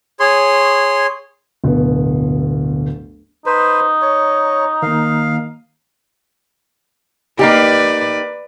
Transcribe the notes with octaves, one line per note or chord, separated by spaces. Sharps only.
G#4 C#5 C6
D1 G1 B2
D#4 B4 C5
C#5
D#3 A#3 F5
A#3 D#4 G4 B4 D5